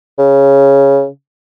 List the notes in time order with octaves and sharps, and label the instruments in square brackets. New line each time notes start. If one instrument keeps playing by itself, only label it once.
[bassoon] C#3